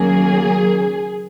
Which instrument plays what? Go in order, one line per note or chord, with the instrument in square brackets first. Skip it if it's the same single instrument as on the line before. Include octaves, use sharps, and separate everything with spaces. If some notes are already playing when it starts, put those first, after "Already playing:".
Already playing: [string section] D#2 C#3 F#3 A#3 G#4